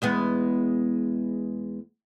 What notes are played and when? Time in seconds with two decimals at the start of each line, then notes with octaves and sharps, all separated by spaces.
0.02 E2 G#3 B3